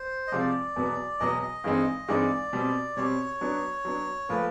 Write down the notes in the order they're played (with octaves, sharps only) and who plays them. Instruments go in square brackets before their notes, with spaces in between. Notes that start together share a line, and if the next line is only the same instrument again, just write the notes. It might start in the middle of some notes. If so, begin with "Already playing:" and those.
Already playing: [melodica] C5
D#5
[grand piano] C3 F3 G#3 C4 [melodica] D5
[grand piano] E2 B2 F#3 B3
[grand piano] E2 B2 F#3 B3 [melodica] D#5
[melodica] D#5
[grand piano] G2 E3 G#3 C4 D#4
[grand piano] G2 E3 G#3 C4 D#4 [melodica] D5
[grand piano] B2 G3 C4
[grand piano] B2 G3 C4 [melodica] C#5
[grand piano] F#3 B3 D4
F#3 B3 D4
[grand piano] A#2 F3 A3 [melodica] B4